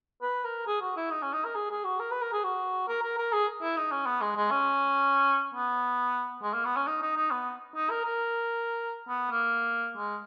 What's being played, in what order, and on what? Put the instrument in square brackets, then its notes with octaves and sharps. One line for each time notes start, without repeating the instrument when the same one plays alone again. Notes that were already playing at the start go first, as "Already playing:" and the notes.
[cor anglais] B4
A#4
G#4
F#4
E4
D#4
C#4
D#4
A#4
G#4
G#4
F#4
A#4
B4
A#4
G#4
F#4
A#4
A#4
A#4
G#4
E4
D#4
C#4
B3
G#3
G#3
C#4
B3
G#3
A#3
B3
C#4
D#4
D#4
D#4
B3
D#4
A#4
A#4
B3
A#3
G#3